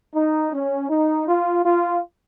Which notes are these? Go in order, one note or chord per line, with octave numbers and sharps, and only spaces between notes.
D#4
C#4
D#4
F4
F4